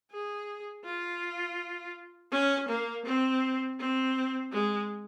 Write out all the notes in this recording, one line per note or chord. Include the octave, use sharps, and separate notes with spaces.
G#4
F4
C#4
A#3
C4
C4
G#3